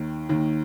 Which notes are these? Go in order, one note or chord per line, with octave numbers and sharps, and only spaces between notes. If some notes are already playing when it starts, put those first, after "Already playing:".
Already playing: D#2 D#3
D#2 D#3